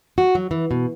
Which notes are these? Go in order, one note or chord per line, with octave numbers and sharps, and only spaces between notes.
F#4
F#3
E3
B2